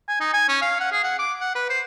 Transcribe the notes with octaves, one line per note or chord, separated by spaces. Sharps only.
G#5
D#4
G#5
C#4
F5
F#5
G#4
F#5
D6
F#5
B4
C5